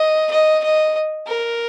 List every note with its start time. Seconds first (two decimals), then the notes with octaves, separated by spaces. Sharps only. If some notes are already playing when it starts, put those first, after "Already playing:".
Already playing: D#5
0.31 D#5
0.63 D#5
1.27 A#4